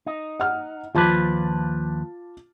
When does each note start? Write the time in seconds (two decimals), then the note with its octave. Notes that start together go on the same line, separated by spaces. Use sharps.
0.06 D#4
0.40 F#5 F6
0.95 D#2 F3 F4 B4 A5 D6